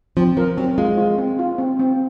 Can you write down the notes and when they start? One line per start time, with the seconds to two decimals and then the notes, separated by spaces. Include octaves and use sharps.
0.17 F3 C4
0.37 F3 A#4
0.57 F#3 C4
0.78 G#3 F4
0.97 F4
1.18 C4
1.39 F4
1.58 C4
1.79 C4